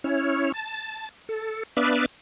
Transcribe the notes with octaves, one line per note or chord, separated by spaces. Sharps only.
C#4 E4 C#5
A5
A4
B3 D4 B4 D5 E5 F5